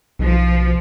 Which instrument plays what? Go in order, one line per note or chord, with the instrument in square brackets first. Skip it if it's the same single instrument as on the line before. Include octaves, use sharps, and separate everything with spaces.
[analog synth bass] B1 [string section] F3